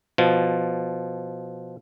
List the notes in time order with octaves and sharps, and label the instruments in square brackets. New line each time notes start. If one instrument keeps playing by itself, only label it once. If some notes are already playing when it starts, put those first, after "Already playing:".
[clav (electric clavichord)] B2 F3